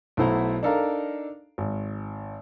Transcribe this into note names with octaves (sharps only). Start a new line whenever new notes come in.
B1 A3 E4 C5 F#5 A#5
D4 D#4 A4 A#4 F5 A#5
G#1